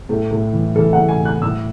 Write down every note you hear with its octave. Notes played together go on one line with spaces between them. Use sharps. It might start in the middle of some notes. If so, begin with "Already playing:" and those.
A2 A4
A2
E3
E3 A4
F#5
A2
G#5
A2 F#6
A2 E6